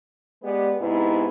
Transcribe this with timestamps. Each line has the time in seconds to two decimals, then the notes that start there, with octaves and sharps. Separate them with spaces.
0.42 G#3 B3 G4 B4 D5
0.79 G#2 C3 B3 D#4 E4